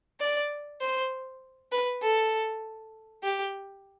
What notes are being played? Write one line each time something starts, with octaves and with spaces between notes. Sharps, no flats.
D5
C5
B4
A4
G4